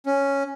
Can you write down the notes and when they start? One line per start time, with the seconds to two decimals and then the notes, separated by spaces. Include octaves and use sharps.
0.06 C#4